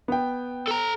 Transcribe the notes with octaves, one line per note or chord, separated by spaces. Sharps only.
B3 G5
A4 A#5